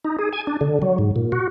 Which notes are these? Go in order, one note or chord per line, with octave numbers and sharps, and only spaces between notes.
D#4
G#4
G#5
D4
D3
F#3
G#2
A#2
F#4